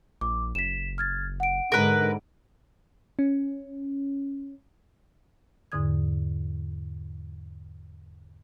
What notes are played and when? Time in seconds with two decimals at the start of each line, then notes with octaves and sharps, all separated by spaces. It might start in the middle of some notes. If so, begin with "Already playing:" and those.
0.21 A#1 D6
0.55 F#1 B6 E7
0.98 F6 G#6 A6
1.40 F#5 D7
1.72 G#2 D3 A#4 B4
3.19 C#4
5.72 E2 G#2 D3 D#6 G#6